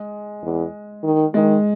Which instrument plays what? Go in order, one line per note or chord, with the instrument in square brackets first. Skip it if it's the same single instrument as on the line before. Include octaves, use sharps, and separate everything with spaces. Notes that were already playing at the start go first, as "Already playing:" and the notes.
Already playing: [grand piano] G#3
[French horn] E2
D#3
[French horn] D#3 [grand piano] G#3